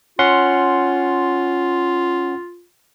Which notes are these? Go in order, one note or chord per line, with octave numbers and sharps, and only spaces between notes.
C#4 F4 F#5 C6